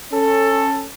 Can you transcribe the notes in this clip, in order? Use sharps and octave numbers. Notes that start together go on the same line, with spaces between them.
C#4 A4